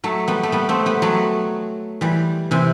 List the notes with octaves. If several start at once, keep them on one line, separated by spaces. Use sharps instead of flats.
F#3 A3
G3 B3
A3
G3 B3
A3 C4
G3 B3
F#3 A3
E3 G3
C3 E3